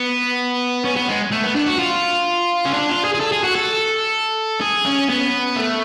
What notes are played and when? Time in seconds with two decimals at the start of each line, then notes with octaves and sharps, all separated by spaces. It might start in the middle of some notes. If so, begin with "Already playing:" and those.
Already playing: B3
0.85 C#4
0.96 B3
1.08 G#3
1.32 A3
1.44 B3
1.56 D4
1.67 F#4
1.79 F4
2.66 C#4
2.74 D4
2.89 F4
3.05 G#4
3.15 G#4
3.20 A4
3.32 G#4
3.44 F#4
3.56 A4
4.61 G#4
4.86 C#4
5.09 B3
5.56 A3